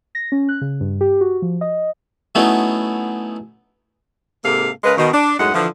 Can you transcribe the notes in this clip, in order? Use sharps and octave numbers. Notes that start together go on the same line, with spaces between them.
A#6
C#4
F#6
C#3
G2
G4
F#4
F3
D#5
F#3 A3 B3 C#4 D#4 E4
G#2 C3 A#3 A4 F5
C#3 G#3 A#4 B4
B2 D#3
D4
F#2 A2 G#3 D#4 F#5
D3 E3 F3